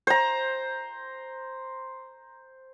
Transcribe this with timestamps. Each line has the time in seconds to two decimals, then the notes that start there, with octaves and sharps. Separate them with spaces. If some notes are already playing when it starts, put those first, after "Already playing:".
0.07 C5 A#5